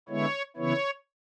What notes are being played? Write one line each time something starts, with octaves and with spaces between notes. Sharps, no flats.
D3 G#3 B3 E4 C#5
C#3 E3 B3 E4 C#5